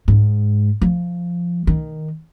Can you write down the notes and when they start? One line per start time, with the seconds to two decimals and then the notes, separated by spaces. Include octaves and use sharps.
0.08 G#2
0.82 F3
1.67 D#3